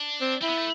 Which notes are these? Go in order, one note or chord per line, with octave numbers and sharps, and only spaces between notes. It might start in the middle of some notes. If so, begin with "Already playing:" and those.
Already playing: D4
C4
C4 E4
B3
A3